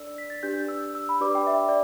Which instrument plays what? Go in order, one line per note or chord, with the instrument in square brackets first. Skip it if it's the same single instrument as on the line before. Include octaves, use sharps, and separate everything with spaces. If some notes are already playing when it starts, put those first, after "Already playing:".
Already playing: [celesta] D4 A4 D5 E6
B6
A6
D4 G4 B4 D5 G6
E6
E6
B5
D4 G4 B4 D5 D6
G5
E5
D5